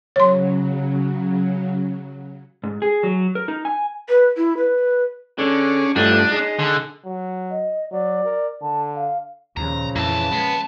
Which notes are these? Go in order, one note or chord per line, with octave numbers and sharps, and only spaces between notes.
C#3 F#3 C#5 C6
G#2
G#4
F#3
A#4
D#4
G#5
B4
E4
B4
D3 C#4 D4 G#4
G2 D3 F3 A3 D4 D#5
G#3 D#4
D3
F#3
D#5
F#3 D5
A#4
D3 A5
F5
D#2 A#2 C#3 F3 A#5
F2 E3 A#3 A5
G#3 B3